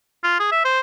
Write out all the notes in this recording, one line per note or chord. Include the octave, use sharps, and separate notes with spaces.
F4
G#4
E5
C5